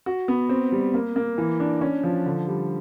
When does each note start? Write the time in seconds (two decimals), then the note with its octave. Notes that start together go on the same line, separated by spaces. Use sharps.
0.06 F#4
0.28 B3
0.49 C4
0.72 G3
0.94 A#3
1.16 A#3
1.38 E3
1.60 D4
1.81 C#4
2.03 F3
2.26 D3
2.48 G3